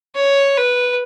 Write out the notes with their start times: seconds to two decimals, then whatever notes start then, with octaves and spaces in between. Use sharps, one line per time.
0.15 C#5
0.57 B4